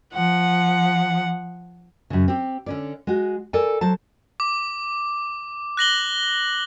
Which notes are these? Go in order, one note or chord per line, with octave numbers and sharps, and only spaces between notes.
F3 F#5
F#2 C#3
C4 G4
D3 C#4 D5
G#3 F#4
A4 A#4 D5 G#5
F#3 C5 A5
D6
F#6 A#6 F#7 G7